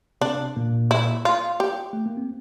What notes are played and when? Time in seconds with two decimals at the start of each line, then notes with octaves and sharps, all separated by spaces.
0.21 C3 C4 D4
0.56 A#2 A#3
0.91 E4
1.25 F4
1.60 G4
1.93 A3
2.06 A#3
2.17 C4